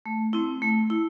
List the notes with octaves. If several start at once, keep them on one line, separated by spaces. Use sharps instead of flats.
A3
C4 E4
A3
E4